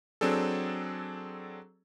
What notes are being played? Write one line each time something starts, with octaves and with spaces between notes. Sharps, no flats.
F#3 C4 D4 G#4 A4